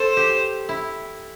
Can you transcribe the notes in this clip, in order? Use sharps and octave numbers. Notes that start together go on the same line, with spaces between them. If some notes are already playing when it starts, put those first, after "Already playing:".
Already playing: A4 C5
G4
E4